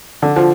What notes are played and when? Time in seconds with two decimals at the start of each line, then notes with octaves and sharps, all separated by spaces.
0.22 D3
0.36 F3